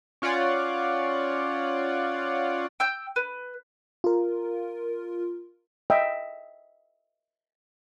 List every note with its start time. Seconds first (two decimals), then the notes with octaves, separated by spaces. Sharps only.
0.22 C#4 F4 C#5 D5 F#5
2.80 G5 E6 G6
3.16 B4
4.04 F4 A#4
5.90 D#5 E5 G5